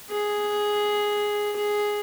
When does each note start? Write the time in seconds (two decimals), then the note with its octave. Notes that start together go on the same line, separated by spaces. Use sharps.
0.10 G#4
1.56 G#4